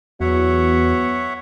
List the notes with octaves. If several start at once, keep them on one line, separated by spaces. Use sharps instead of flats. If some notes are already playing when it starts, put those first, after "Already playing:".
E2 F#3 B3 C#5 E5 F#5